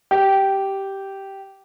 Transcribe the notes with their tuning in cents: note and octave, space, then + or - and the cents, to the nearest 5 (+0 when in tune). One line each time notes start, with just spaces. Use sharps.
G4 -10